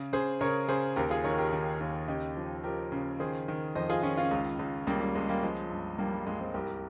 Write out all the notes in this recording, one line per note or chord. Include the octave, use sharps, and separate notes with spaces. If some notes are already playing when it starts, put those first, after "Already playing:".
Already playing: C#3
C#3 G#4 C5
C#3 A#4 C#5
C#3 G#4 C5
D#2 G4 A#4
F4 G#4
D#3 A#4 C#5
G4 A#4
D#3
D#2
C#3 D#4 G4
F3
F3 G4 A#4
C#3
D#3 G#4 C5
D#3
F2 C5 D#5
F4 G#4
D#3 C#4 F4
C#4 F4
C#2
C#2
C#2 G3 A#3
G3
C#2 G#3
G3 A#3
F3 G#3
G2
G2 G3 A#3
G3
G2 G#3
G#3 C4
C2 G4 A#4